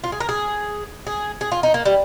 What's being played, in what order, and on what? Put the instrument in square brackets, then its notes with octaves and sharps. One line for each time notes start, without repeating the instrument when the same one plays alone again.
[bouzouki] F4
G#4
A#4
G#4
G#4
G#4
F4
D#4
A#3
G3